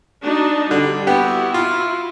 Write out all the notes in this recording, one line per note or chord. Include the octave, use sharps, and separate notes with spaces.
D4 D#4 F#4
D3 G3
B3 E4 F#4 G4
F4